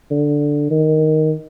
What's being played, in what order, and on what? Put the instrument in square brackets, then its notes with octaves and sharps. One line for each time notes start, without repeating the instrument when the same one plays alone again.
[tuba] D3
D#3